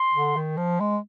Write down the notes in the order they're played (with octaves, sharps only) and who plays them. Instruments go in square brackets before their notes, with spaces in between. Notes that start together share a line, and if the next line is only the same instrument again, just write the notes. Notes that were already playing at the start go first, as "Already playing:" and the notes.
Already playing: [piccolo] C6
[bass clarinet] D3
D#3
F3
G#3